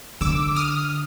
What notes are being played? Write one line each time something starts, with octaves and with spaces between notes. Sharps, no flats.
D3 D6 E6
D#6 F6